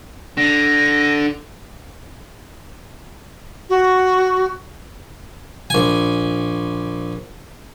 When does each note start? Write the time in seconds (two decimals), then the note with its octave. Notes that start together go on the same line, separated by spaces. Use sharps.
0.38 D3 A#6
3.70 F#4
5.70 A#1 G#5